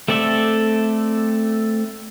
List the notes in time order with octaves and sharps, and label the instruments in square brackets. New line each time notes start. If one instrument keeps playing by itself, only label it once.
[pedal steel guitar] A3 C4 A4 D5 E5